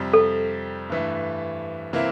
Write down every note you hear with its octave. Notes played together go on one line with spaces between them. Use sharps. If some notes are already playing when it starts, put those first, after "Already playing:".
Already playing: F2 C3 G3
A4
G2 E3 A3
C3 E3 A#3 E4